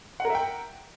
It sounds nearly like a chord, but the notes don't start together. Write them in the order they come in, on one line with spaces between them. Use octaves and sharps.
F#5 A#4 E5 G5